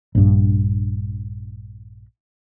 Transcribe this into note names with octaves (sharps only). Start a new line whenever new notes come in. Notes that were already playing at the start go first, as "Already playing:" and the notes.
A#1 G2